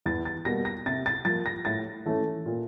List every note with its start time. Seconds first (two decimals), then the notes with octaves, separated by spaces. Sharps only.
0.06 E2 A6
0.25 A6
0.45 B2 G3 A#3 A#6
0.65 A#6
0.86 C3 A6
1.06 A6
1.25 F3 A#3 A6
1.46 A#6
1.65 A2 A6
2.06 E3 A3 C#4
2.46 A#2